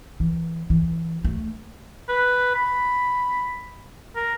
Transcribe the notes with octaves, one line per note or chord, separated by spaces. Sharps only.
E3
E3
A3
B4
B5
A#4